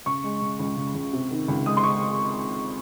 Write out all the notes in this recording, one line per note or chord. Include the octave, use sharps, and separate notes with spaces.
C#3 C#6
G#3
C#3
C#2
C#3
C#2
C3
D#3
C#2
G#3 D#6
C6
G#3 C#6